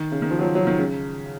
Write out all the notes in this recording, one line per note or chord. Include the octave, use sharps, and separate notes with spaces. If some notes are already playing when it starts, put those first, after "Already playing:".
Already playing: D#3
C#3
D#3
F3
F#3
F3
F#3
D#3
C#3